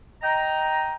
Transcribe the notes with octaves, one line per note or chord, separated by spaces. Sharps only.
D#5 G5 A#5